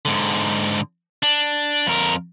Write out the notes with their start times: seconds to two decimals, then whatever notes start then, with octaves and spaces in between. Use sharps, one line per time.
0.05 G#2 D3
1.23 D4
1.87 F2 A#4